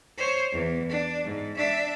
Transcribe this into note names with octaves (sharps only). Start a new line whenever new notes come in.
C5 C#5
E2
D4
G#2
D4 E5